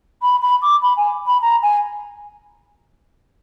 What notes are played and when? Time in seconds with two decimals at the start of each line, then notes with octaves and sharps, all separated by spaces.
0.21 B5
0.41 B5
0.61 D6
0.82 B5
0.96 G#5
1.26 B5
1.41 A#5
1.62 G#5